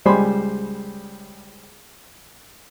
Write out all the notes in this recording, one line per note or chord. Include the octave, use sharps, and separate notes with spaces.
C#2 G3 C5 G#5 B5 C6